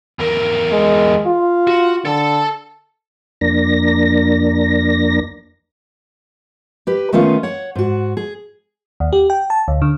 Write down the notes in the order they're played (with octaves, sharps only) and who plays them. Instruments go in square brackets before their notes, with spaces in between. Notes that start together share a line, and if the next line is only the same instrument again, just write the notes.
[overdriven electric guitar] E2 A#4
[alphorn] G#3
F4
[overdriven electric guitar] F#4
[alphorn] D3 [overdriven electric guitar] A4 A5
[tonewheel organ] F2 A#3 D4 A#6
[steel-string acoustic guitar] G4 B4
D#3 A3 B3 C#4 F4 F5
C#5 F#5
G#2 F#4
G#4
[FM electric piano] D#2
G4
G5
A5
D2
D3